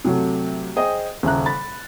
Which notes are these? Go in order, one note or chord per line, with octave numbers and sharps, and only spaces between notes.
C3 F#3 A3
G#4 C5 D#5 G5
D#1 C#3 E5 A#5 F#6
B5 A6